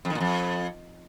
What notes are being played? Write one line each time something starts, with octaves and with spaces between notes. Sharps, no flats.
F2
D#3
A#2
F2